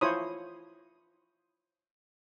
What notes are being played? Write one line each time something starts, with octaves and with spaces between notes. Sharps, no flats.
E4 F4 C5 C#5 B5 D#6